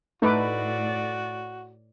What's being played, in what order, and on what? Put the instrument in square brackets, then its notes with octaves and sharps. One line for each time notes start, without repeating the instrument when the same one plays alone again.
[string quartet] A2 D5 [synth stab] A3 [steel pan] D#4 B4 D6 [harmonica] F#4